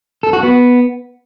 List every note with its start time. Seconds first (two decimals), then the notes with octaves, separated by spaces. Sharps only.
0.23 A4
0.33 F#4
0.43 B3